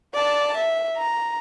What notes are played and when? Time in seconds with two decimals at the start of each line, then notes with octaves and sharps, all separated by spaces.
0.14 D5 A5
0.58 E5
0.97 A#5